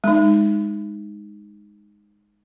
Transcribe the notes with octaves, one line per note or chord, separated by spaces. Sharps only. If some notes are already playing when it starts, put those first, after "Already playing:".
G#3 D#4